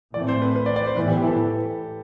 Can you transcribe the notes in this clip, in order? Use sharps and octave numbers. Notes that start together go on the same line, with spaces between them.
A2 E3 A3 C4 D5
C5
B4
B4
D5
D5
C5
A2 E3 B3 B4
G4
G4
A4